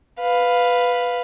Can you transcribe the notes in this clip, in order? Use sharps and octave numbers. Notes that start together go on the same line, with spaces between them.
B4 F5